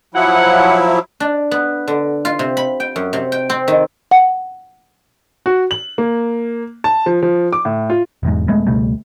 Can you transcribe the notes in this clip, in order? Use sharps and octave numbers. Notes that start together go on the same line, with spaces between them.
F3 F#3 E4 F#5
D4
B3
D3
F4
C3
B5
G5
F#2
C3
G5
C4
D#3
F#5
F#4
F#7
A#3
A5
F3
F3
D6
A2
F4
E1 E2 G#2
D#1 G#3 A3 B3
C#2 B2 G3 A3